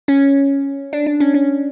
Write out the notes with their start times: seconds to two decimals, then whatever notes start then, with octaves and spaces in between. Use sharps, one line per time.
0.08 C#4
0.93 D4
1.07 D4
1.20 C#4
1.34 C#4